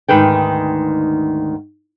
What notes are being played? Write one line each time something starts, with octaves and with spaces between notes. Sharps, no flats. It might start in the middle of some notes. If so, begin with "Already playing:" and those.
D2 G#2 D#3 B4 G5